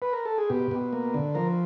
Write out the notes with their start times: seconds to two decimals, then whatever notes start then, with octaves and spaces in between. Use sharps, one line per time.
0.02 B4
0.13 A#4
0.26 A4
0.38 G#4
0.50 B2 G4
0.71 B2
0.93 A#3
1.14 D3
1.35 F3 A#4